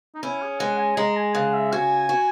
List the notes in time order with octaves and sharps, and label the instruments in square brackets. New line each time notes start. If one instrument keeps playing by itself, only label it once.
[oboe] D#4
[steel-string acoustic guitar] C#4 [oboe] E4
[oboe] G#4
[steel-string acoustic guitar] G#3 [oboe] F#5
[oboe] G#5
[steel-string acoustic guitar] G#3 [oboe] A#5
[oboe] G#5
[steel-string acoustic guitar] C#3 [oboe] F#5
[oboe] E5
[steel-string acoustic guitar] F#4 [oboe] G#5
[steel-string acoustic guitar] F#4